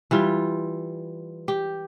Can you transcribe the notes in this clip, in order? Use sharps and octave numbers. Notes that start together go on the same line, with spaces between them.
E3 G3 F4
G4